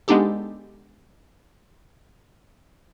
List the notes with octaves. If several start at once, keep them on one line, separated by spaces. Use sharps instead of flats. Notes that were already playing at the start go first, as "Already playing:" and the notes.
G#3 B3 D4 D#4 G4 A4